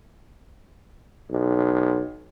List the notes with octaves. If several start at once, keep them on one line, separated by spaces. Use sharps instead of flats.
B1